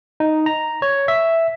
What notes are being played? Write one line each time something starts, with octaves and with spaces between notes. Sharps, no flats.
D#4
A#5
C#5
E5